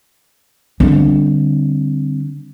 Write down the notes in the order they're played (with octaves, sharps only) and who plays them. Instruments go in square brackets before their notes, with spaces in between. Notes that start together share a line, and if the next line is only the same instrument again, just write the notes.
[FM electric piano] D3 [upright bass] G3 C4